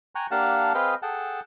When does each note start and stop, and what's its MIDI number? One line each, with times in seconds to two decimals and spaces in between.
0.15 0.27 79
0.15 0.27 80
0.15 0.27 82
0.15 0.27 85
0.15 0.27 90
0.31 0.73 58
0.31 0.73 62
0.31 0.73 67
0.31 0.73 77
0.31 0.73 78
0.31 0.73 81
0.74 0.95 60
0.74 0.95 68
0.74 0.95 71
0.74 0.95 75
0.74 0.95 77
0.74 0.95 79
1.02 1.40 68
1.02 1.40 69
1.02 1.40 78
1.02 1.40 79
1.02 1.40 81